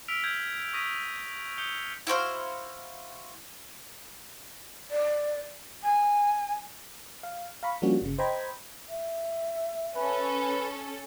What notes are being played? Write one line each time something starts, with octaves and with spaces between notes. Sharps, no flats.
E6 F6 B6 D7 F7 G7
F6 G6 G#6
C#6 D#6 A#6 B6 D#7
D#6 G6 C#7 F7 G7
E4 F#4 C5 F5
D5
G#5
F5
F5 A#5 B5 C#6
F3 G3 A#3 C#4 D4 F#4
G1 C#3
C5 D#5 G5 A#5 B5 G#6
E5
C#4 A4 B4